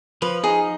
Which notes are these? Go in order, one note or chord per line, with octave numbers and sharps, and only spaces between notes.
F3 B4
D#4 G#4